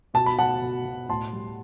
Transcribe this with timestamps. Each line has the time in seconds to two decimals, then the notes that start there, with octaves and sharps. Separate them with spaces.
0.14 B2 A5
0.26 B5
0.38 B2 F#5 A5
0.61 B2
0.85 B2
1.09 A2 A5 C6
1.33 G3